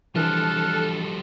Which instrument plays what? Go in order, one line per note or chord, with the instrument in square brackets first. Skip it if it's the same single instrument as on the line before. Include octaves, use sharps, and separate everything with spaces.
[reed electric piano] E3 D4 [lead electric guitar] F3 G3 [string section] A4 [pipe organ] F6 F#6